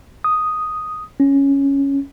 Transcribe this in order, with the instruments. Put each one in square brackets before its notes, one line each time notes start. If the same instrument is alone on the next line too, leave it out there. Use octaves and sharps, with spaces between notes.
[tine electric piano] D#6
C#4